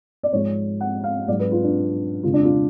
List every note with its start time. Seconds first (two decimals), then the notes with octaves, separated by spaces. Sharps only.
0.23 D5
0.33 G#2 F3 G#3 C#5
0.81 F#5
1.04 F5
1.28 G#2 F#3 D5
1.40 B4
1.52 F4
1.64 D4
2.23 F2 C#3 G#3 F4
2.34 D4
2.44 F4